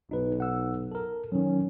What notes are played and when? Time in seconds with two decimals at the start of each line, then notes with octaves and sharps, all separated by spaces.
0.11 B1 D#4 B4
0.40 F#5 E6
0.91 A4 A#4
1.32 D#3 F#3 C#4